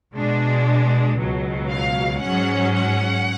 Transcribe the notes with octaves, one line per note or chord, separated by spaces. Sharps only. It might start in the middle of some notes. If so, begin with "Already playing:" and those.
B2 G#3 D4
C#2 B2 F#3
F5
G#2 F#3 C#4 F#5
F#5